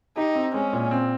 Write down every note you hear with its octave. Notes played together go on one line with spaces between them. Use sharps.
D#4 G4
C4
G#3 C#4
A#2
C4